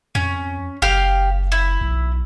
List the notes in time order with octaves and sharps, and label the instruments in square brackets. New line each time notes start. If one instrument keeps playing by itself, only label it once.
[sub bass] F2 [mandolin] C#4
[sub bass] F#1 [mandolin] G4 F5
[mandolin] E4
[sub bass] B1